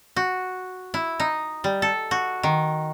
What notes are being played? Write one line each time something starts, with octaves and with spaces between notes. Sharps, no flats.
F#4
E4
D#4
G3
A4
F#4
D#3